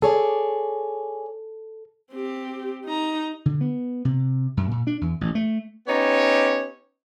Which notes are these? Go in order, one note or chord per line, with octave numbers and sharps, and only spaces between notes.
G#4 A4 C#5 D5
C4 G4
D#4 A#5
D3
B3
C3
F#2
A#2
D4
E2
A1
A3
B3 C#4 D#4 G4 C#5